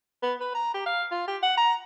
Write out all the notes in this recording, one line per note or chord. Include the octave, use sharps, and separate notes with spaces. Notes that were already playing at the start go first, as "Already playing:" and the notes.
B3
B4
A#5
G4
F5
F4
G4
F#5
A#5